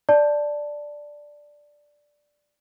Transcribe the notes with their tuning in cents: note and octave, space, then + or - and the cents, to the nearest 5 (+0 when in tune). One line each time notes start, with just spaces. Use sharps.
D5 +0 A5 +0